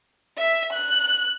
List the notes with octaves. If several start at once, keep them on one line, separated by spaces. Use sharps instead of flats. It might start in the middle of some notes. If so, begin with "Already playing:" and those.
E5
F#6